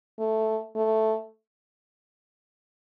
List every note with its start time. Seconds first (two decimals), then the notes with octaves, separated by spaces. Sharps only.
0.19 A3
0.76 A3